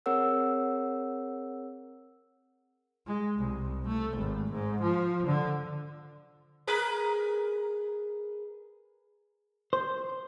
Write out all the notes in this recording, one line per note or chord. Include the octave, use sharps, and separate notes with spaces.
C4 G#4 A#4 C#5 F#5 E6
G#3
C2
A3
G#1
G#2
F3
D3
G#4 A#4 B4
C5